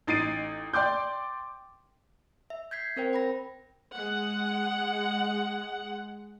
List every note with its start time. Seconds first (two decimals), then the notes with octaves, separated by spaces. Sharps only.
0.07 A1 D#4 A6 C7 D7 D#7
0.74 D5 G5 C6 D6 G6
2.50 E5
2.71 G6 G#6 B6 C7
2.96 C4 A#4 C5 G5
3.13 G5 B5 A#6
3.93 G#3 F#5